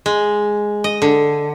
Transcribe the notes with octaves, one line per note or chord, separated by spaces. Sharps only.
G#3
D#5
D3